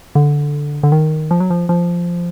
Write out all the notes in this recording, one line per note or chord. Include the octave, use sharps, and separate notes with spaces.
D3
D3
D#3
F3
F#3
F3
F3